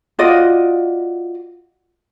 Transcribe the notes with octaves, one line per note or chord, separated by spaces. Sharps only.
F4 F#4 D5 D#5